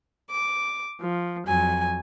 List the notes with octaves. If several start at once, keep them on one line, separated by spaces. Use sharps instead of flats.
D6
F3
F2 F#3 G#5